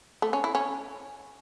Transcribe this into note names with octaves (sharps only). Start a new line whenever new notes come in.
A3
C#4
E4
C#4